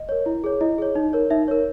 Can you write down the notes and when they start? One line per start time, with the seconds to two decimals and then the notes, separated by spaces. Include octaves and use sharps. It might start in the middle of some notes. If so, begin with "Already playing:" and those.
Already playing: D#5
0.09 A#4 C#5
0.26 E4
0.44 G#4 C#5
0.61 E4 D#5
0.78 G#4 C#5
0.95 D#4
1.13 A#4 C#5
1.30 D#4 E5
1.48 A#4 C#5